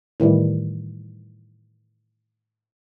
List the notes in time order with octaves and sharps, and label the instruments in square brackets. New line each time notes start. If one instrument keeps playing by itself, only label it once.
[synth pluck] A2 D#3 E3 G3